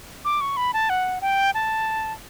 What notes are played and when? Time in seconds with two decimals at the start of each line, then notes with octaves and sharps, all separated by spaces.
0.25 D6
0.41 C#6
0.57 B5
0.74 A5
0.90 F#5
1.21 G5
1.54 A5